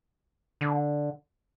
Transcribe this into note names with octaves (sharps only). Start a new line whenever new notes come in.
D3